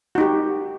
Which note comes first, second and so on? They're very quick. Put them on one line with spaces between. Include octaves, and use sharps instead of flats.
F#4 D#4 G4